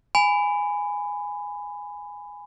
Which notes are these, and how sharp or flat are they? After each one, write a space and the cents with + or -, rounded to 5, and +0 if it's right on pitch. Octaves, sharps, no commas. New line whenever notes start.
G#5 -5 B5 +20